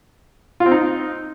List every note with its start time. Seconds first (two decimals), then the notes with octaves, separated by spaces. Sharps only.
0.60 F4
0.66 C4
0.71 D#4